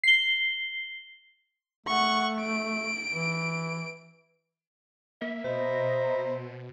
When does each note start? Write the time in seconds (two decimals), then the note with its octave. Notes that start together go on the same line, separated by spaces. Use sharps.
0.04 C7 G7
1.87 A3 F#5 C#6
2.41 D7
3.12 E3
5.22 A#3 E5
5.44 B2 C5 D#5 A#5 B5